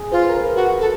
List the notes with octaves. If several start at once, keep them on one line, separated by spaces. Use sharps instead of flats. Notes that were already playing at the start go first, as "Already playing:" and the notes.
Already playing: G#4
F4 C5
B4
A#4
B4
F#4
A4